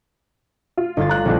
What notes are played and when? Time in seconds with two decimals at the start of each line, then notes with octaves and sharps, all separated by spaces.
0.77 F4
0.97 G1 D#4 F4 A6
1.09 A#5 F#6
1.25 A#1 D#3 A3 C4 D4